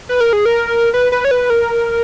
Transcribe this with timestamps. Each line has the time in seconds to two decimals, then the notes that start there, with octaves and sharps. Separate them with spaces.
0.09 B4
0.21 A#4
0.33 G#4
0.46 A#4
0.94 B4
1.12 B4
1.25 C#5
1.31 B4
1.50 A#4